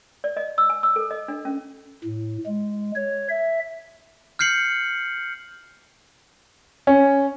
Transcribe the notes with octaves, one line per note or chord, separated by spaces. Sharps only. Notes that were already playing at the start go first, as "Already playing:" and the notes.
D5
D#5
E6
G#5
E6
A4
D#5
D4
C#4
A2
G#3
C#5
E5
F6 G6 C7 C#7 F#7
C#4